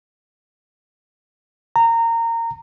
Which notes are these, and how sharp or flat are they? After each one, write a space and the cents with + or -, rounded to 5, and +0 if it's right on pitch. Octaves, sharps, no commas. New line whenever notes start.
A#5 -20